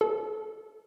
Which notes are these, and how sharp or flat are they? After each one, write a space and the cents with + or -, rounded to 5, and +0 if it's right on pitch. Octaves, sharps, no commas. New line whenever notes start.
A4 -30